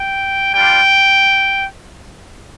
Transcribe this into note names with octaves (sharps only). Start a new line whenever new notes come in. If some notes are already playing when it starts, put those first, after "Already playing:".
Already playing: G5
G3 D4 F4 G5